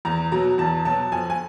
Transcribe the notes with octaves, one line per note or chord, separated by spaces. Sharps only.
E2 A#5
B2 F#3 A#5
E2 A5
B2 F#3 A5
F2 G#5
G#5